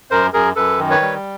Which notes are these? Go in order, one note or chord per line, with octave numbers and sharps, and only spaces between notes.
F#2 A#4 C5
F#2 G#4 A#4
F#2 A4 B4
D#3
B4 C#5
G3